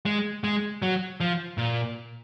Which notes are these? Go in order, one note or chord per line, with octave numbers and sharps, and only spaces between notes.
G#3
G#3
F#3
F3
A#2